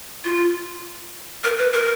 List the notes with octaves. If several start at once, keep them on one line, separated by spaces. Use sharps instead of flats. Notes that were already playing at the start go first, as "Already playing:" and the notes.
F4
A#4
B4
A#4